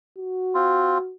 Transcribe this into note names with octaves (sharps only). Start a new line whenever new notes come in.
F#4
C4 F4